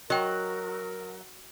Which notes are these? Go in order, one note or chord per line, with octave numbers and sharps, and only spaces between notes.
F#3 A#4 D#5 G5